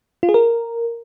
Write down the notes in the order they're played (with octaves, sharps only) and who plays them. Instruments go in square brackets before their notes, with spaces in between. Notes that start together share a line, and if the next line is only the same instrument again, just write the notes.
[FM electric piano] F4
G#4
A#4